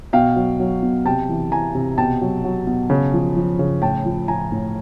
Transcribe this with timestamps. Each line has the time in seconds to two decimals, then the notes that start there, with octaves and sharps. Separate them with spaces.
0.13 B2 F5 G5
0.36 F#3
0.60 F#3
0.83 B2
1.05 C3 G5 A5
1.29 E3
1.51 E3 G#5 A#5
1.75 C3
1.98 B2 G5 A5
2.21 F#3
2.44 F#3
2.67 B2
2.90 C#3
3.14 F3
3.36 F3
3.59 C#3
3.82 A2 G5 A5
4.05 F3
4.28 F3 G#5 A#5
4.52 A2